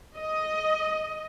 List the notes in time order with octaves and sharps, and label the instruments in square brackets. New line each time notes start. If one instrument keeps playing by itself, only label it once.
[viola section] D#5